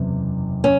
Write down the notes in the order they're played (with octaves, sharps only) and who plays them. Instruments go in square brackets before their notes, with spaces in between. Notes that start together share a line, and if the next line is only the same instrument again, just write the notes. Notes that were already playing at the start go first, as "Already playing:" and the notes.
Already playing: [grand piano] F#1 E2 C3
[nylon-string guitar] C#4